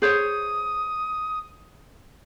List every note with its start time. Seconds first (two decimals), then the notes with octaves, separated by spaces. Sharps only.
0.02 G#4 C5 C#5 D#6